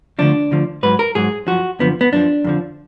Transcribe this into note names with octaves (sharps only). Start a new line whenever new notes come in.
D2 D3 F3 D4
D2 D3 F3
G#2 F#3 B4
A#4
G#2 F#3 G#4
F#2 F3 F#4
F#2 D3 F3 B3
B3
F#2 F3 D4
F2 D3 F3